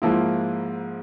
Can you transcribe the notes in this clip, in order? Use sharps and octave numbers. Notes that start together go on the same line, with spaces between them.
G#2 F3 A#3 E4